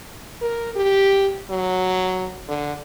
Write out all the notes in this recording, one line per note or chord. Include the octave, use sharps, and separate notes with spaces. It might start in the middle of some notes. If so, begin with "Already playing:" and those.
A#4
G4
F#3
D3